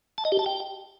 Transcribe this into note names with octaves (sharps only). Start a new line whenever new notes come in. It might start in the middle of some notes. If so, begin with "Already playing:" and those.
A5
D#5
G4
A5
G5